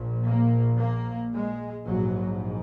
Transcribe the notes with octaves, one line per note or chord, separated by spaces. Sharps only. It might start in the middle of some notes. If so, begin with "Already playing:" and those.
Already playing: A#1 A#2
A#3
A#3
G#3
A#1 G#2 F#3